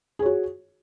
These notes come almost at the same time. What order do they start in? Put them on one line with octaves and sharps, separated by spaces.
G#4 C#5 F#4